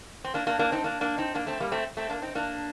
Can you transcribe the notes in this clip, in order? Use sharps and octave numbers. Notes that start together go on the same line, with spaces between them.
C4
A#3 D4
A#3 D4
A#3 D4
C4 D#4
A#3 D4
A#3 D4
C4 D#4
A#3 D4
A3 C4
G3 A#3
A3 C4
A3 C4
A#3 D4
C4 D#4
A#3 D4